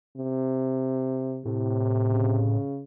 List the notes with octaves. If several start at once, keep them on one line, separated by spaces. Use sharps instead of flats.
C3
A2 C3
C#3